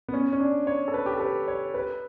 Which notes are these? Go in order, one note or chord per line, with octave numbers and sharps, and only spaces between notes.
B3
C#4
C#4
D4
C#5
A4
B4
G4
A4
B4
C#5
B4